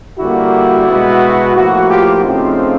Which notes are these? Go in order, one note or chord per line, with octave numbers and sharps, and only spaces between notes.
D3 G3 A#3 E4 F#4
B2 G#3 B3
A2 F3 A#3 E4 F#4
F4 G4
C#3 F3 A3 C4 D#4 F4